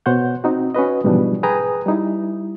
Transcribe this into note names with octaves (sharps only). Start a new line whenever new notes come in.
B2 C5 C#5 F#5 G6
C4 D#4 F#4
C#4 F#4 B4 D#5
G#2 B2 E3 F3 G3 D4
G#4 B4 G5 G#5 A#5 D#6
G3 D#4 E4